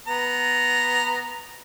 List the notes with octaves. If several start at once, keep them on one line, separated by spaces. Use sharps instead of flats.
B3 A#5